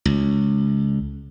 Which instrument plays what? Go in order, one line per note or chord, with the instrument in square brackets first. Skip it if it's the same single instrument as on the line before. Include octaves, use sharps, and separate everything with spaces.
[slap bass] C#2